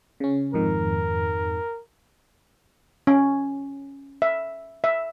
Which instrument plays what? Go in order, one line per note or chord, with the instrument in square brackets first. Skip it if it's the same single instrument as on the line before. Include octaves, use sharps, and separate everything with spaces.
[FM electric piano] C#3 C#4
[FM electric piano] F2 G#2 D#3 [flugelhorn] A#4
[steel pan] C#4
E5
E5